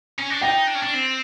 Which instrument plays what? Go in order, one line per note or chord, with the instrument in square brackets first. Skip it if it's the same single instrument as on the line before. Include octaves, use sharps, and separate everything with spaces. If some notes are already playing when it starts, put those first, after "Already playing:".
[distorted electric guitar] C#4
D4
[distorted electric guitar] D#4 [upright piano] G5
[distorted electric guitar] D4
C#4
D4
C4